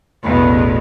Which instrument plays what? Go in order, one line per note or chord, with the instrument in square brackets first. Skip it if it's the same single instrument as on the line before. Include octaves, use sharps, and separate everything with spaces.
[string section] A1 E2 B2